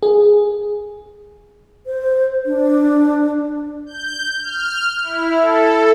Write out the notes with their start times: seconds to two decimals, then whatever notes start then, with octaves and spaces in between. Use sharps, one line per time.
0.03 G#4
1.86 C5
2.46 D4
3.86 G6
4.42 F6
5.02 E4
5.37 A4